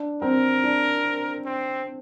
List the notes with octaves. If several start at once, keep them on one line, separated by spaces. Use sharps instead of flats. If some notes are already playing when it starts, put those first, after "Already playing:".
Already playing: D4
C4 A#4
D4
C4